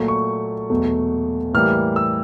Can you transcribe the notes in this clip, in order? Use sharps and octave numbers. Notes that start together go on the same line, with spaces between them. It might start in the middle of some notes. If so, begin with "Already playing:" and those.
Already playing: A#2 F#3 A3
C#6
E2 B2 F#3 A3
A2 E3 G3 A#3 F6
E6